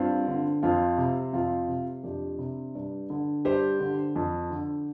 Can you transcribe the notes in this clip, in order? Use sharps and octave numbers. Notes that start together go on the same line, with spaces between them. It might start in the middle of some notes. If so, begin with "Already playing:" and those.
Already playing: G2 C4 F4
D3
F2 C4 F4
C3
F2 C4 F4
C3
F2 D4 G4
C3
G2
D3
G2 G4 C5
D3
F2
D3